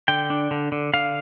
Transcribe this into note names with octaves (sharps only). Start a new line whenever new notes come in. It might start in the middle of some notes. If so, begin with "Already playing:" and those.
D3 G5
D4
D3
D3
D3 F5